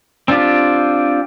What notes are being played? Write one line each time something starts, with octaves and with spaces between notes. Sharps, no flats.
C4 D4 F4 G4